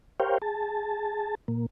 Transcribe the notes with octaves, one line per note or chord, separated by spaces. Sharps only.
G4 A#4 C5 C#5 F5 G5
G#4 A5
A#2 A#3